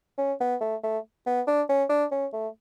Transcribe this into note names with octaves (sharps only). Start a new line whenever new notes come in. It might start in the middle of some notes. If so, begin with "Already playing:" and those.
C#4
B3
A3
A3
B3
D4
C#4
D4
C#4
A3